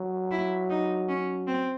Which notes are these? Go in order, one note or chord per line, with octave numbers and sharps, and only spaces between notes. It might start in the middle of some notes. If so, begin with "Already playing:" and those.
Already playing: F#3
E4
D#4
C#4
C4